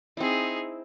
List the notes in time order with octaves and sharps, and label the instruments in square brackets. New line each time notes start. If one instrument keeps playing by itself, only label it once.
[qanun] C4 E4 [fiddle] D#4 G#4